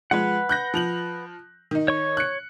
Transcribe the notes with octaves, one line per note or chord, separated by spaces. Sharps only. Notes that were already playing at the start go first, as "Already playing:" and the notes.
F3 G#3 B4 F#5
F#6 G6 A#6
F3 F7 F#7
D#3 D#4
C#5 C#6
F#6 C#7